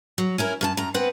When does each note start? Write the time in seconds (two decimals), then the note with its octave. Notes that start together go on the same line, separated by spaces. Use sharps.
0.18 F#3
0.38 C#4 E4 A#4
0.61 F#2 A#4 A5
0.77 F#2 A#5
0.94 B3 C4 B4 F#5